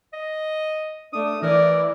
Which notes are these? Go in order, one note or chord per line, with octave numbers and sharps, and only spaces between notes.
D#5
A3 D4 D#6
E3 A#4 D5